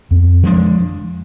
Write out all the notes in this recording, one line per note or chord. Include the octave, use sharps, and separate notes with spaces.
F2
F3 G#3 D4